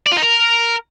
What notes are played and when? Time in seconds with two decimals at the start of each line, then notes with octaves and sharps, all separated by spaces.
0.07 D5
0.12 F4
0.17 D#4
0.22 A#4